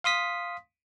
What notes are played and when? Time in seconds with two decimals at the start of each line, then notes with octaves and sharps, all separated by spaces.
0.04 F5 C6 D#6 B6